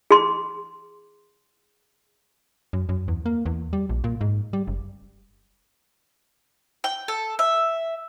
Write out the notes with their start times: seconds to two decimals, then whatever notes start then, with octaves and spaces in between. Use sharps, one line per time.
0.11 G#4 C6
2.73 F#2
2.89 F#2
3.08 E2
3.26 A#3
3.46 E2
3.73 G3
3.89 A#1
4.04 A#2
4.21 G#2
4.53 G3
4.67 F#1
6.84 G5
7.08 A4
7.39 E5